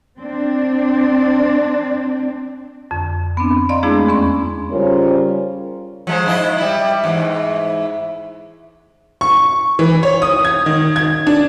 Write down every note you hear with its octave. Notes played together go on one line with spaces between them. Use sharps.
C4 D4
F2 D3
B3 C4 D4
D5 D#5 F5 A#5 C6
G#3 A3 B3 D4 E4 G#4
E2 B3 C#4 C6
C#3 G3 C#4 F4 A#4 C5
F3 G#3 C5
G#2 E4 D#5
G3 E4
G#2 E3
C#6
E3
C#5
D#6
G#6
D#3
G#6
D4